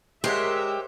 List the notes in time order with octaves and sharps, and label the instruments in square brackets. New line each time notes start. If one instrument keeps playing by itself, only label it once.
[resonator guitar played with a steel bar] G#3 [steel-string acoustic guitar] G4 [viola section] A#4 E5 [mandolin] C5 C#5 F#5